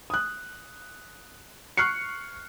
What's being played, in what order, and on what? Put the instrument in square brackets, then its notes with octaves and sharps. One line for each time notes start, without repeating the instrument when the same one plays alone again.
[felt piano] D#6 F#6
C#6 F6 F#6 C7 C#7